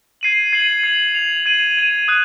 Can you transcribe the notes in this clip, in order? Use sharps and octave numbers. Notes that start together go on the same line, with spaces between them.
G#6 C7 D#7 F#7
G#6 C7 D#7 F#7
G#6 C7 F7
G#6 C7 F7
G#6 D#7 F#7
G#6 D#7 F#7
D#6 F#6